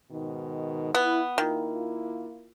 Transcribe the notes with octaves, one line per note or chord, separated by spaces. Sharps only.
G#2 B2 D#3
B3 E4
D#3 A#3 E4 F4